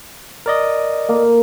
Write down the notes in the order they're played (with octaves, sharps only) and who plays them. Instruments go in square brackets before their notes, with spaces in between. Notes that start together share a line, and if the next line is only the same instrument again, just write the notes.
[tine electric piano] A#4 D5 D#5
[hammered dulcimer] A#3